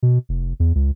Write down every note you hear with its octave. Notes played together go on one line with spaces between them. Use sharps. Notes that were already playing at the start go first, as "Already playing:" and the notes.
B2
F1
E2
C#2